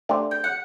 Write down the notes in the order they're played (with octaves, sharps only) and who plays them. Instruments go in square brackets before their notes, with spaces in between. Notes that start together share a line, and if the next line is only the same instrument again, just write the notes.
[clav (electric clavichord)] A3 D4 G4 C5
[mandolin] G5
F#5